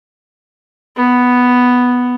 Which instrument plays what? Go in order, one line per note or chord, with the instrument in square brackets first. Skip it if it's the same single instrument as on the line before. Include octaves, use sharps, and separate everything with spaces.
[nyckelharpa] B3